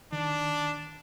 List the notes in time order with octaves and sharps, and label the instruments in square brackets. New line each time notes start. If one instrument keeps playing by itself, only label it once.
[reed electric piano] D#3 [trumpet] D4